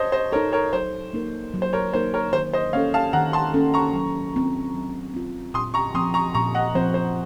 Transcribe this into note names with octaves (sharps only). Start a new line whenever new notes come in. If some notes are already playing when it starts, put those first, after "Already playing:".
Already playing: C5 C#5 D#5 A5
C5 D#5
D#4 A4 A#4 C#5
A#4 C#5
F#3 C5
A#3 D#4 A#4
F#3
C5
A#4 C#5
A#3 D#4 A#4 C5
A#4 C#5
D#3 C5
C5 D#5
A#3 C#4 A4 C#5 F5
F5 A5
D#3 F#5 A#5
A5 C6
A#3 C#4 A4
A#5 C#6
F#3
C4 F4
F#3
C4 F4
A#2 C6 D#6
A#5 C#6
F3 C4 C6 D#6
A#5 C#6
A#2 A#5 C#6
D#5 F#5
F3 C4 C5
C5